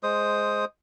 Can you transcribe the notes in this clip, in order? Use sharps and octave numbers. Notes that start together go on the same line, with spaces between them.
G#3 C5 D#6